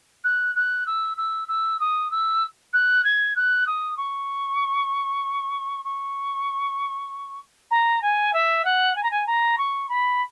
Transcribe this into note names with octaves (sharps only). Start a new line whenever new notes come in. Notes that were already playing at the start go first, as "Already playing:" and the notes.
F#6
F#6
E6
E6
E6
D#6
E6
F#6
G#6
F#6
D#6
C#6
C#6
A#5
G#5
E5
F#5
G#5
A#5
G#5
A#5
C#6
B5